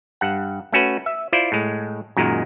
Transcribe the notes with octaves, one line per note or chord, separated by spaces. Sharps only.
G2 F#5
A3 C#4 F#4 B4
E5
E4 F4 C5 D5
A2 G#3
F#2 A#2 D#3 G#3